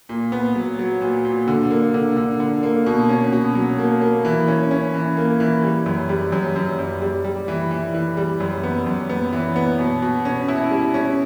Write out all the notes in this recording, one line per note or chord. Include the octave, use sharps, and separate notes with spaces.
A#2
B3
F#3
F#3
A#2
A#2
D3
A#3
D3
D3
D3
A#3
B2
C#4
B2
F#3
A#3
A#3
E3
C#4
C#4
E3
A#3
E3
G3
F#2
G3
F#2
F#2
F#2
G3
G3
E3
E3
E3
G3
F#2
B3
F#2
B3
E3
B3
B2
B2
C#4
E4
G3
C#4